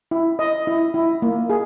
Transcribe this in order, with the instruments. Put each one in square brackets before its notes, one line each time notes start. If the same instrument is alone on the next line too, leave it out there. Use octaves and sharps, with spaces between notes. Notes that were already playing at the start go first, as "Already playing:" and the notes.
[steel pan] E4
D#5
E4
E4
A#3
G#4